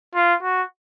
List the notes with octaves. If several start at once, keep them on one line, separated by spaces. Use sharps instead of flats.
F4
F#4